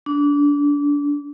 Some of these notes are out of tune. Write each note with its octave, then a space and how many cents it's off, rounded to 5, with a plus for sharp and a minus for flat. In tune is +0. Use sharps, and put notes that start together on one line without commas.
D4 -25